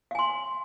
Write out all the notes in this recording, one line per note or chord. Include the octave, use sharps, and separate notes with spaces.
F5 G#5 C6